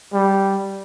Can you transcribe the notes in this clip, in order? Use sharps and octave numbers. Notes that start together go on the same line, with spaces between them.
G3